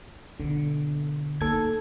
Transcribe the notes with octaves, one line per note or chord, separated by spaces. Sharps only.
B2 D3
A#3 D#4 A4 G#6